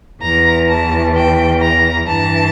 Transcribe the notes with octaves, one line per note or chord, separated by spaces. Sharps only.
E2 E3 A#5
A5
G5
A#5
G2 E3 A5